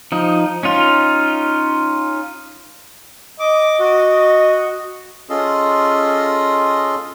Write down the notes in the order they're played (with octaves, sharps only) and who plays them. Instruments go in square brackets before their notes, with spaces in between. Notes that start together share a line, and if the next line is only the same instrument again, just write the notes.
[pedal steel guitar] F3 D#4
C#4 D#4 F4
[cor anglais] D#5 [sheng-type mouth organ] D6
[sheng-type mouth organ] F#4
[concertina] C#4 F4 G#4 A4 D#5 C6